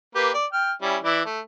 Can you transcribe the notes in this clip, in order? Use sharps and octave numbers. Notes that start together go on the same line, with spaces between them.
A#3 G4 B4
D5
G5 F6
G3 C#4 E4
E3 E4 D5
A3